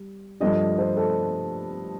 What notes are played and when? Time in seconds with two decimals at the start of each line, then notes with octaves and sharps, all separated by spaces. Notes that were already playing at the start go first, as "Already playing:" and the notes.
Already playing: G3
0.40 G2 F3 A3 D4 D#5
0.79 C5
0.97 A4